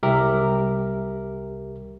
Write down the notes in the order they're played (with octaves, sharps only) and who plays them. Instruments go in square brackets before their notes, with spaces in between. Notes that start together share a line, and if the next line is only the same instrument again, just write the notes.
[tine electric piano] C2 G4 A#4 E5